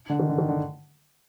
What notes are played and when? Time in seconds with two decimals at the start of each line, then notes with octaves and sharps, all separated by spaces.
0.10 D3
0.19 D#3
0.29 D3
0.38 D#3
0.49 D3